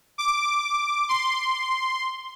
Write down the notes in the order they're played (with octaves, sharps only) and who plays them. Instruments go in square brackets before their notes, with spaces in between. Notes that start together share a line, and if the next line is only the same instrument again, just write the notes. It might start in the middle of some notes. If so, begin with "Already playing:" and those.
[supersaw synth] D6
C6